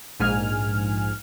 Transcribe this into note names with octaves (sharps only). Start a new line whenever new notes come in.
A#1 G#2 G#5 F6